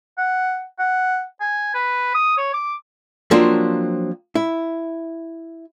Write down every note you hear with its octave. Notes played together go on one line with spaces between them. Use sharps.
F#5
F#5
G#5
B4
D#6
C#5
D6
F3 F#3 A#3 C4 D4
E4